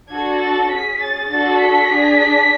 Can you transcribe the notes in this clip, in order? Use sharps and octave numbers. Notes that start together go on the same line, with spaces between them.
D4 F#4 A4 G#6
A6
C#4 G#4 B6
A6
D4 F#4 A4 A6
B6
D4 G#4